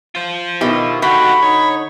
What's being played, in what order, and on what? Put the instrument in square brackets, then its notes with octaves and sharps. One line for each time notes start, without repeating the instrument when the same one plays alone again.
[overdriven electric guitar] F4 C5
[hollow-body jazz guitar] B2 D#3 G4 [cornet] E4
[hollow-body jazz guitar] D3 [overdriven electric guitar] D#4 G4 [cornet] F#4 [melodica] B5
[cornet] D#4 [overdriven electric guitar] C#5